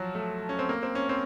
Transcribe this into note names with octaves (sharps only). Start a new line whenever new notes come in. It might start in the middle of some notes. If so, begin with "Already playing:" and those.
Already playing: F3 F#3
A3
C#4
C4
A#3
C4
C#4
C4